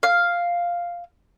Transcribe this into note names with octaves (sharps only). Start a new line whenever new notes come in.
F5